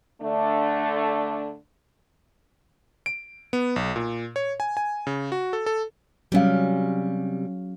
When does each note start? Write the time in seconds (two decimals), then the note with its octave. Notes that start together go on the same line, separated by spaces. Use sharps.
0.20 D3 A3 D4
3.06 D7
3.53 B3
3.76 B1
3.96 A#2
4.36 C#5
4.60 G#5
4.77 G#5
5.07 C#3
5.32 F#4
5.53 A4
5.66 A4
6.32 C3 F#3 G3 C#4 F5